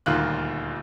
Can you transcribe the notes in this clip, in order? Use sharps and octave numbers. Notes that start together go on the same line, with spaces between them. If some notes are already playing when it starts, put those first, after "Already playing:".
D#1 D2 A#2 D#3 F4 F#6